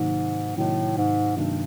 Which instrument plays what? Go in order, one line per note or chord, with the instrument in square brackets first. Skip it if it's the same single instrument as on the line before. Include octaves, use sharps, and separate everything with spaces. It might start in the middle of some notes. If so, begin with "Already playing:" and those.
Already playing: [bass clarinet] G#2 [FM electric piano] C3 D#3 F#3 A#3 D#4
[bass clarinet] A2 [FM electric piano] C3 D#3 F#3 A#3 D#4
[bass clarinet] G#2
[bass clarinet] G2 [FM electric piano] C3 D#3 F#3 A#3 D#4